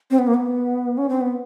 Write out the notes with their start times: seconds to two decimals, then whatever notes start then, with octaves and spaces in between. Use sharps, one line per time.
0.11 C4
0.19 B3
0.27 A#3
0.34 B3
0.98 C#4
1.09 C4
1.21 B3